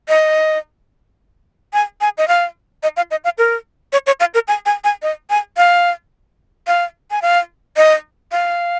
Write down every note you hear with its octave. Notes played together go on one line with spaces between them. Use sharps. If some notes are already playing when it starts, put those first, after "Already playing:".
D#5
G#5
G#5
D#5
F5
D#5
F5
D#5
F5
A#4
C#5
C#5
F5
A#4
G#5
G#5
G#5
D#5
G#5
F5
F5
G#5
F5
D#5
F5